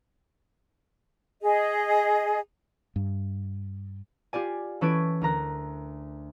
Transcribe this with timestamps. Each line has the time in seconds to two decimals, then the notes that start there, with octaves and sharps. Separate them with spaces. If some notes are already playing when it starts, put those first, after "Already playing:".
1.42 G#4 D#5
2.96 G2
4.33 F4 G4 D5 G#5
4.81 E3 C#4 A4 B4 G#6 D7
5.21 D2 A#4 A#5 F#6